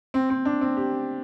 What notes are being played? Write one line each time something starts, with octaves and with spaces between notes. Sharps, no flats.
C4
C4
D4
C4
G4